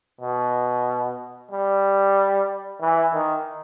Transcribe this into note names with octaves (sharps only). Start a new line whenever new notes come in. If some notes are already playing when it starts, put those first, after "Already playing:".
B2
G3
E3
D#3